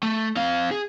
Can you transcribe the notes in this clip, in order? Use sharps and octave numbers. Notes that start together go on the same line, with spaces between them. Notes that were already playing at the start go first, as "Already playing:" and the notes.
A3
C4 F5
G#4